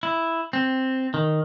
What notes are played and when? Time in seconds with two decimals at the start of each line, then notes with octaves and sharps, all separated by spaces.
0.03 E4
0.53 C4
1.14 D#3